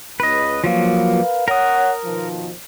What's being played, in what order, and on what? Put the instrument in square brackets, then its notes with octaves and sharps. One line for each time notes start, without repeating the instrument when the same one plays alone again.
[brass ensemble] C#2 [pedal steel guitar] B4 D#5
[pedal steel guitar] F3 F#3 A#3 [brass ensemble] A#4 B4 F5
[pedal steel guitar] A#4 D#6 [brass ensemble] C#5 F#5
[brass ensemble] B2 D#3 F3